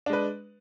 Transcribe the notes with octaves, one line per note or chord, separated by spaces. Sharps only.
G#3 D4 B4